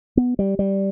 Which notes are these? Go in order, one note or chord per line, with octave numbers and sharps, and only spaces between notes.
B3
G3
G3